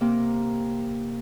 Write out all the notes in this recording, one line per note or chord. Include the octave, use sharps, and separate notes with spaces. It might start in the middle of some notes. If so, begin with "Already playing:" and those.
C3 A#3